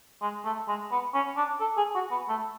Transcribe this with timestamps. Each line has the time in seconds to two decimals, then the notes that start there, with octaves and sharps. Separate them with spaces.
0.22 G#3
0.45 A3
0.68 G#3
0.91 B3
1.14 C#4
1.37 D4
1.60 A4
1.77 G#4
1.95 F#4
2.11 B3
2.29 A3